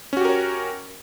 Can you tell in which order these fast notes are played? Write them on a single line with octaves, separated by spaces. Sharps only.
C#4 F#4 G4 A#4 C#5